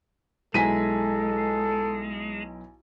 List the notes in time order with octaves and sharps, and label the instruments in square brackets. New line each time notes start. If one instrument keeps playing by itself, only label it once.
[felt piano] B1 E4 A#5 [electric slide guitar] G#3 [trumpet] A4 [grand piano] G#5 B6 D#7